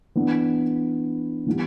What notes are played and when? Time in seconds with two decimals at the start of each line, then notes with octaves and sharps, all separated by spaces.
0.15 E3 B3 D4
1.46 E3 G3 B3 E4